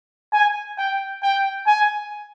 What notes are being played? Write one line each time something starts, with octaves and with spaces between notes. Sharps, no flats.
G#5
G5
G5
G#5